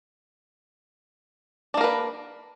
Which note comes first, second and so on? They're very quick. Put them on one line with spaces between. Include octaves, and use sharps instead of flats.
D4 A#3 A#4 B4